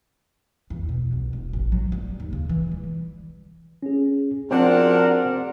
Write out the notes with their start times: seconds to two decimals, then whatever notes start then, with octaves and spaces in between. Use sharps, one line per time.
0.70 E2
0.89 B2
1.12 C2
1.33 D#1
1.53 A1
1.72 F#3
1.92 G3
2.20 D#2
2.33 C#3
2.49 E3
2.72 G3
3.83 C#4 G#4
4.51 F3 C4 D4 F#4 G#4 A#4 F#5